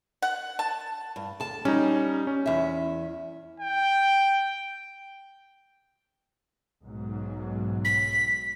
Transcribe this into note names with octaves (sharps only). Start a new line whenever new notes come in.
F#5
A5
G2
D2 A5
G3 C#4 D#4
C#4
E2 E5
G5
B1 G#2 F#3
B6